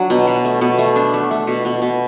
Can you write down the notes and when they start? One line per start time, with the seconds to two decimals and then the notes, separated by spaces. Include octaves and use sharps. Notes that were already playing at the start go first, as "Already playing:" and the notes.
Already playing: F#3 D4
0.10 B2
0.27 B2
0.44 A3
0.61 B2
0.78 A3
0.96 D4
1.14 A3
1.31 A3
1.47 B2
1.65 B2
1.82 B2